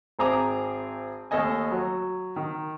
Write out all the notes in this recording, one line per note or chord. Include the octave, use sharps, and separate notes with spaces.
G#1 C4 G#4 A#5 D6 D#6
D#2 A3 A4 D#5 G#5
F#3
D#3